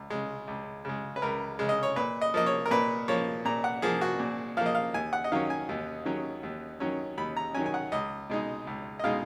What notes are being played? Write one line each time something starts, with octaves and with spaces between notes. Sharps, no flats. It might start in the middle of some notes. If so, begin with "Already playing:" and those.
Already playing: C#2
C#3 G#3
C#2
C#3 G#3
B4
C#2 A#4
C#3 G#3
D#5
C#5
A#2 B4
D#5
F3 A#3 D#5
C#5
A#4
A#2 B4
F3 A#3 C#5
A#2 A#5
F#5
F3 A#3 G#4
F#4
A#2
F3 A#3 D#5 F5
F5
D#2 G#5
F#5
D#5
D#3 F#3 C#4 F5
G#5
D#2
D#3 F#3 C#4
D#2
D#3 F#3 C#4
D#2 B5
A#5
D#3 F#3 C#4 G#5
G#5
F#5
C#2 D#5
B2 G#3 D#4
C#2
D#5
B2 G#3 D#4 F5